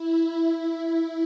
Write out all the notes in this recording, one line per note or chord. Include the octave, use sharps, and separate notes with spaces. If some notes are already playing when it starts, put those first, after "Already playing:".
Already playing: E4
E4